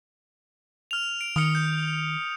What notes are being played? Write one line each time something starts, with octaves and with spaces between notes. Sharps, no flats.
F6 F7
D7
D#3 D#6 F6 C#7
G6